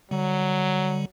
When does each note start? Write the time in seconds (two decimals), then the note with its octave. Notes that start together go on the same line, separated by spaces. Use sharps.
0.11 D3 F#3 G3